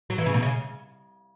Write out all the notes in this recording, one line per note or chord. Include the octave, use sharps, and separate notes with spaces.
F#3
E3
C#3
B2
C#3